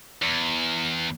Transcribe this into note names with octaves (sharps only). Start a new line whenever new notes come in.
E2